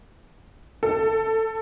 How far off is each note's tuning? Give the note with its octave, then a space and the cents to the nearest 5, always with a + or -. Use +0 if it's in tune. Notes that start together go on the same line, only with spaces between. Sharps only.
A4 +15